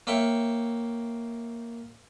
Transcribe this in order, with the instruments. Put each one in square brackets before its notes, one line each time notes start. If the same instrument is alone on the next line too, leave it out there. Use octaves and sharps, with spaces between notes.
[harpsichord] A#3 C#5 E5 G5 C#6